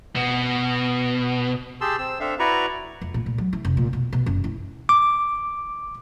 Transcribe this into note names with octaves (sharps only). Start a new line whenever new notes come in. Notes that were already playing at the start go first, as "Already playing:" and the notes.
B2
G4 G#4 A5 C6 E6
C4 E6
C4 D4 A4 E5 F5
E4 F#4 B4 D5 A#5 C#6
F2
A#2
A#2
F#3
E3
F1
A#2
B2
B2
F#1
E4
D6